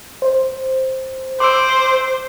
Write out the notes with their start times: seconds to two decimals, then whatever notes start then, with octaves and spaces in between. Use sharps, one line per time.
0.22 C5
1.40 C5 C6 D6 E6 D7